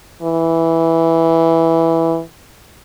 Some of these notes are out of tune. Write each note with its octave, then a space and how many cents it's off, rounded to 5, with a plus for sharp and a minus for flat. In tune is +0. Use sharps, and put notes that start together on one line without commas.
E3 -5